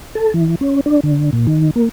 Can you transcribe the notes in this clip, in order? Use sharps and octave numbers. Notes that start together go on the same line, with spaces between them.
A4
E3
C#4
D4
D3
A#2
D#3
A#3